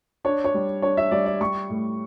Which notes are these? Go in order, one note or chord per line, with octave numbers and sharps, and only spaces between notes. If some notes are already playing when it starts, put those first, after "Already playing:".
D4 C#5
C#5
G3
D4 C#5
E5
G3 D5
D5
G3 C#6
A2